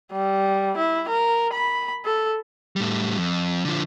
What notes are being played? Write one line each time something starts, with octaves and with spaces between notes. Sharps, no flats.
G3
E4
A#4
B5
A4
A2 G3
F2
D3 F3